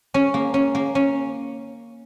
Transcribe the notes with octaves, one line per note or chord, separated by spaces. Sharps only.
C#4
A#3
C#4
A#3
C#4